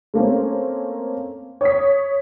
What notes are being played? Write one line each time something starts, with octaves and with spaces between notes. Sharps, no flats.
A3 A#3 C4 C#4
C#5 D#6 B6